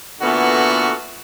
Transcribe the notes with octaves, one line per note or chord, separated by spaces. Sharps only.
A#2 D3 E3 A3 B3 F#4